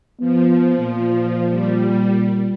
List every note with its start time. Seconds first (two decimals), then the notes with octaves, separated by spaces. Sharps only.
0.20 F3 B3
0.78 A#2
1.49 G3